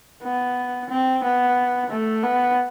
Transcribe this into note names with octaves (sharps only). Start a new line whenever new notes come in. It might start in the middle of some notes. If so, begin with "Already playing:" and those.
B3
C4
B3
A3
B3